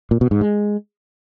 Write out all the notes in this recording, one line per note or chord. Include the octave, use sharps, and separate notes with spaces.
A#2
B2
G#2
G#3